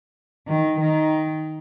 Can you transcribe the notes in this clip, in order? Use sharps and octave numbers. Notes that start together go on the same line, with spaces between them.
D#3
D#3